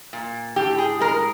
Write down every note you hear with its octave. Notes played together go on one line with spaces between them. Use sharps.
A#2
A2 G4
G#4
G#3 A#4